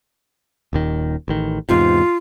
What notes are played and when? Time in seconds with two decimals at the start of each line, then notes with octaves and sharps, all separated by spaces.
0.73 D#1 D#2 D#3
1.28 A1 D#3
1.69 E2 G#2 C3 F4